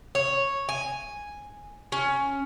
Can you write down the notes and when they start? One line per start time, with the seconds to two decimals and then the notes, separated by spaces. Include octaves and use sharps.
0.15 C#5
0.69 G#5
1.92 C#4